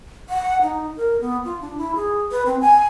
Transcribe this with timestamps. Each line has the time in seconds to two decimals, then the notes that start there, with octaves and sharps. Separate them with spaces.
0.29 F#5
0.62 D#4
0.97 A#4
1.21 B3
1.45 F4
1.61 D4
1.78 E4
1.96 G#4
2.31 B4
2.46 C4
2.61 G#5